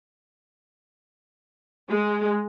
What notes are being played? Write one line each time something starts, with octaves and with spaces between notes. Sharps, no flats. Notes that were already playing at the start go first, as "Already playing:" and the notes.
G#3